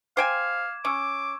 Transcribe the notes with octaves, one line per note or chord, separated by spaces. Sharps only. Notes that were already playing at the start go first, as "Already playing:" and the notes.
C5 F5 G5 G#5 D6 G#6 E7
C#4 C#6 D6 E6